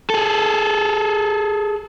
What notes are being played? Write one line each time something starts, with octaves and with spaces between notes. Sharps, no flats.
G#4 A4